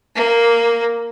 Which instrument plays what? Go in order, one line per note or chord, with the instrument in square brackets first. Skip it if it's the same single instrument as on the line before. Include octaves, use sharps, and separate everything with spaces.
[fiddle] A#3